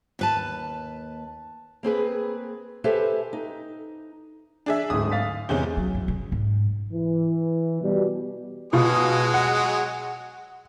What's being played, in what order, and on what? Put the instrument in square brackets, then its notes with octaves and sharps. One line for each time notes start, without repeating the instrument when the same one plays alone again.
[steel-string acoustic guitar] D#2 B4 A5
A#3 C4 G#4 B4
G4 A4 B4 C5 E5 G#5
D#4
[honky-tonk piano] D4 G#4 E5
[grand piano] D1 G#2 [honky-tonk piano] D#6
[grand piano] F5 A6 B6
[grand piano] E2 G7 [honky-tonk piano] C3 G#3 C#4
[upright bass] F#3
F#2
C#3
G#2
[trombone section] E3
B2 G3
[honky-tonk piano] B2 F4 [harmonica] F#3 G#3 G#4
[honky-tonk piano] F#5